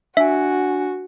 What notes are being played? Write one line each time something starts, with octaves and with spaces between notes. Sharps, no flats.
D4 F#4 E5 G#5